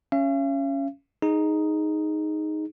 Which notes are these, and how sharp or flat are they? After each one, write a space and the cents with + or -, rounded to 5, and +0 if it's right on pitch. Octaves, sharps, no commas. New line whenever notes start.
C#4 +0 F5 -45
D#4 +0 G#4 +0